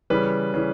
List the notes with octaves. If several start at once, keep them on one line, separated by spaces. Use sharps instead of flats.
C#3 E3 G3 B4
C#3 E3 G3